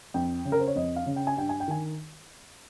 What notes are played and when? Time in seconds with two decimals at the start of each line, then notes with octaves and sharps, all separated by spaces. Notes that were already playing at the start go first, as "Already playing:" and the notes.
0.14 F2 G5
0.45 C#3
0.52 A#4
0.59 C5
0.67 C#5
0.75 F2 D#5
0.96 F5
1.06 C#3
1.16 G5
1.27 G#5
1.37 G2 G5
1.49 G#5
1.60 G5
1.68 D#3 G#5